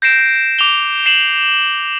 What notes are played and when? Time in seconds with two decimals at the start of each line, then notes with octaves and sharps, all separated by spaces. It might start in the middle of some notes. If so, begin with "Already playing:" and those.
0.02 G6 A#6 C7 D7 E7
0.59 D6 F7 G7
1.06 C7 E7 F#7 G7